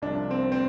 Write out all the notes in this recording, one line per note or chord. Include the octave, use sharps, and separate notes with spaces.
C2 C3 F3 D4
C4
C4